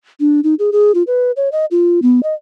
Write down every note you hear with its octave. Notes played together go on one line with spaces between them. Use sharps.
D4
D#4
G#4
G#4
F4
B4
C#5
D#5
F4
B3
D#5